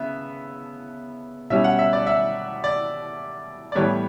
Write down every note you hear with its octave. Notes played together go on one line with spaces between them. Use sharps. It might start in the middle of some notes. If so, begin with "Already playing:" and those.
Already playing: C#3 B3 E5
B2 G3 C#4 E5
F#5
E5
D5
E5
D5
D5
A2 E3 G3 B3 C#5